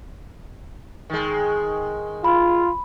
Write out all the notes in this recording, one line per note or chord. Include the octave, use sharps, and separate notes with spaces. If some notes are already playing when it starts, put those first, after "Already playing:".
D#3 G#3
F4 B5